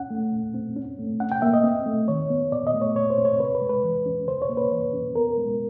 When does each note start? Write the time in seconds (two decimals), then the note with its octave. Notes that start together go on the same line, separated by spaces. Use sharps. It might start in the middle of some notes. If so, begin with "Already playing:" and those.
Already playing: C#4 F#5
0.10 A3
0.32 A#2
0.54 C4
0.76 C#4
0.99 A3
1.20 C#4 F#5
1.32 G5
1.42 A#3 E5
1.54 D#5
1.64 C4
1.86 A3
2.08 D#3 C#5
2.30 B3
2.51 A#2 D5
2.67 D#5
2.74 A3
2.81 C#5
2.96 A#2 C#5
3.10 C5
3.18 C4
3.25 C#5
3.40 C3 B4
3.55 B4
3.61 G#3
3.69 B4
3.84 E3
4.06 C#4
4.28 C#3 C5
4.42 C#5
4.49 A#3
4.57 B4
4.72 E3
4.93 C#4
5.15 B3 A#4
5.37 G#3